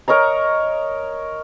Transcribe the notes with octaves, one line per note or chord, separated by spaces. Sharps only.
A#4 C#5 D#5 A#5